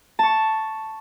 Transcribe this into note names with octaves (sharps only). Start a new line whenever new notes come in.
A5 C#6